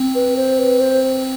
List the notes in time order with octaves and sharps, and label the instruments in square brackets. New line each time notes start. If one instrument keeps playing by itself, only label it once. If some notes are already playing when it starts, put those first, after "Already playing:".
Already playing: [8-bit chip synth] C4
[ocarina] B4
C5
B4
C5